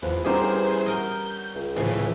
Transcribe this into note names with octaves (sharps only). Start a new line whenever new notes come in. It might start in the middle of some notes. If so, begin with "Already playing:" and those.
E2 F3 B4
E3 G3 B3 C#4 G4 G#4 A#4 C5
F#4 A#4 D#5 G6
C#2
A2 C#3 E3 F3